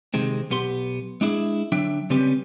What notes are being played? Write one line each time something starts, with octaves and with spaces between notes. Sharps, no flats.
C3 D#3 G#3 C4
B1 B3 G4 C6
G#3 D4 E4 G#4
D3 F#3 D4 E5 G5
C#3 G3 C4 C#4 G4 B4